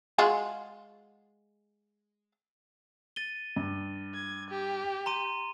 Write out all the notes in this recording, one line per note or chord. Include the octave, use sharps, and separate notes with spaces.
G#3 F4 F#4
A6 D#7 G7
G2
G#6
G4
A#5 C6 D#7